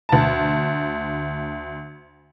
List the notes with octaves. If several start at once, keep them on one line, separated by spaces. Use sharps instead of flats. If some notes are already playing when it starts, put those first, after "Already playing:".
D2 A5